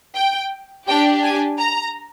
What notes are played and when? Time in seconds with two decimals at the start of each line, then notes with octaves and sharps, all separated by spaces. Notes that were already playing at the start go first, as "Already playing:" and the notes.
0.14 G5
0.87 D4 G4 G5
1.23 G#5
1.58 A#5